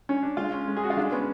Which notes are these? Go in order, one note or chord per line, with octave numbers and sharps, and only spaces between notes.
C#4
D4
G#3 F4
C#4
G#3
G#4
C#4 F#4
F4
G#3 D4
B3 C#4